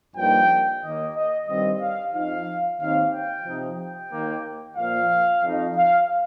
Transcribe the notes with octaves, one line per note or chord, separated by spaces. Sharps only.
G2 F3 A#3 D#4 G5
D#2 D#3 A#3 D#5
D#5
G2 D#3 G3 C4 D#5
F5
F2 F3 D#4 F5
D#2 D#3 C4 D#4 F5
G5
C3 F3 D#4
G5
D#2 D#3 A#3
A#2 F3 A#3 F5
F2 F3 D#4
F5